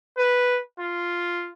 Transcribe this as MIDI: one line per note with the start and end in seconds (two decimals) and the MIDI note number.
0.18 0.60 71
0.79 1.50 65